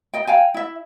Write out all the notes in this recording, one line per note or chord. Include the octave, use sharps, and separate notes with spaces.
D#5 G5
F5 G5 G#5
E4 E5